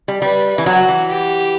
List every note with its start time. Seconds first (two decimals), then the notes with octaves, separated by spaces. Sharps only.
0.08 G3
0.22 G3 B4
0.58 E3
0.66 F#3 F#4
0.88 E3
1.10 G4